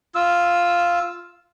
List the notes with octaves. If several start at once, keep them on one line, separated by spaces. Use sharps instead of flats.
F4 E6